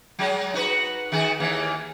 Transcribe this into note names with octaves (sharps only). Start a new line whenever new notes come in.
F#3 G#3
D#4 F#4 B4
D#3 F#4 G#4
D#2 E3 A#3